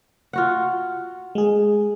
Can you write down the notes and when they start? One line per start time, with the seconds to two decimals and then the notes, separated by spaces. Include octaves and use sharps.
0.33 F4 F#4 F#5
1.35 G#3 G#4